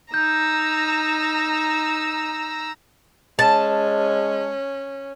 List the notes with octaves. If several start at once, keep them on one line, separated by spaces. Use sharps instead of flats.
D#4 A#5 E6 G6
G#3 C#4 A5